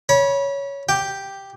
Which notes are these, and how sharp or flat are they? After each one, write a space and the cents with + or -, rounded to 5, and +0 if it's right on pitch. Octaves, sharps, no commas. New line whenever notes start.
C#5 +10 B5 -30
G4 +0 G5 +0